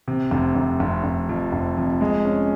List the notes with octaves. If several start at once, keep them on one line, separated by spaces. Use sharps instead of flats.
C3
F1
F1
F1
F1
F2
F1
F2
G#3
C#4